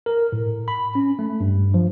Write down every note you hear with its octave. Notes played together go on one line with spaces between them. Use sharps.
A#4
A2
B5
C#4
A3
G2
F3